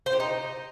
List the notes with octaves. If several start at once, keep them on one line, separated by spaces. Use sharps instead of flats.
C5
G4
D#4